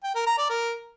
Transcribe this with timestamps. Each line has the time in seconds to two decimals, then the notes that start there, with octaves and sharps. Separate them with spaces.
0.04 G5
0.15 A#4
0.27 A#5
0.38 D5
0.50 A#4